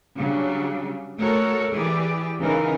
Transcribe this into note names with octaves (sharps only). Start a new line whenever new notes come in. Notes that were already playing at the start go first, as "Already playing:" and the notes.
C#3 F#3 G3 D4
A3 F#4 A4 A#4 C#5
E3 G4 G#4 D5
C#3 E3 F#3 D#4 A#4